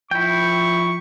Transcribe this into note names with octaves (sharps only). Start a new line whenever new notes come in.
F3 E4 G5 C#6